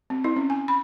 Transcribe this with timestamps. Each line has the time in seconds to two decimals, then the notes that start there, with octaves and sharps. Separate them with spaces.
0.10 C4
0.24 E4
0.36 C#4
0.50 G#5
0.68 B5